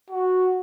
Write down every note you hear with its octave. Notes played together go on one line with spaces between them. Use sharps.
F#4